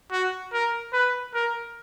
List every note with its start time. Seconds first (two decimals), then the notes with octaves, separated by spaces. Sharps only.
0.12 F#4
0.53 A#4
0.93 B4
1.34 A#4